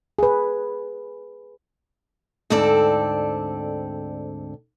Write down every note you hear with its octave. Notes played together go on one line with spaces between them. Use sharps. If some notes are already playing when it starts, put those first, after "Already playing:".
G#4 B4
D2 G#2 C4 A4 D5